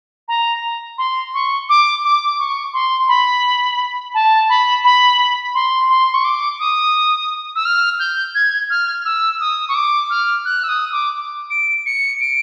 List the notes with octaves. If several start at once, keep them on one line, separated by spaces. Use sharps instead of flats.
A#5
C6
C#6
D6
D6
C#6
C6
B5
A5
B5
B5
C6
C6
C#6
D6
D#6
E6
F6
G6
G#6
F6
E6
D#6
C#6
D6
F6
F#6
E6
D#6
D6
D7
C#7
D7